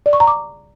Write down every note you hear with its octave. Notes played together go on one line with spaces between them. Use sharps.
D5
C#6
A#5
D6